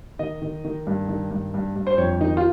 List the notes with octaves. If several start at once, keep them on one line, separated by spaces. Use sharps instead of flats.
D#3 D#5
D#3
D#3
G2
D#3
G2
G2
G2
C5
F2 C#5
D#3 D#4
F4